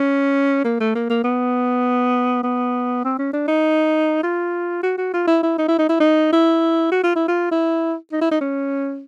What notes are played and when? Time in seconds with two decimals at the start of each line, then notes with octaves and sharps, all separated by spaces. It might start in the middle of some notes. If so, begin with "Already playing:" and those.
Already playing: C#4
0.64 A#3
0.80 A3
0.95 A#3
1.10 A#3
1.24 B3
2.43 B3
3.04 C4
3.19 C#4
3.33 D4
3.48 D#4
4.23 F4
4.83 F#4
4.98 F#4
5.13 F4
5.27 E4
5.43 E4
5.58 D#4
5.68 E4
5.79 D#4
5.89 E4
6.00 D#4
6.32 E4
6.92 F#4
7.03 F4
7.16 E4
7.28 F4
7.51 E4
8.12 D#4
8.21 E4
8.31 D#4
8.41 C#4